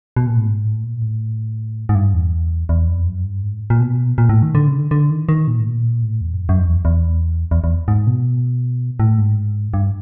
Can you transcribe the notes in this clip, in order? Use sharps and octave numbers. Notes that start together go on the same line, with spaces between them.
B2
A#2
A2
G#2
A2
A#2
A2
G#2
G2
E2
E2
F2
F#2
G2
G#2
A#2
B2
A#2
A2
D#3
D3
C#3
D3
D3
D#3
D#3
A#2
A2
A#2
A2
E2
F#2
F2
F#2
F2
E2
E2
E2
E2
G#2
B2
A2
G#2
G2